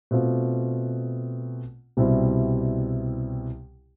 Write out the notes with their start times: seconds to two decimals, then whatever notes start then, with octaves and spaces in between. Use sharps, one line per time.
0.11 B2 A3 C4 F4
1.97 C2 B2 G3 C4 E4